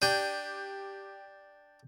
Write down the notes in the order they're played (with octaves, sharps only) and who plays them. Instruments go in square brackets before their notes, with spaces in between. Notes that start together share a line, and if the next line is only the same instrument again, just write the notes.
[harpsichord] D4 G5 [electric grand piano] G4 G6 D#7